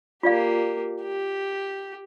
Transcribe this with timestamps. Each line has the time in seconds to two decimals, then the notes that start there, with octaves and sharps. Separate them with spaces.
0.23 A#3 F4 G4 D5 F5
1.02 G4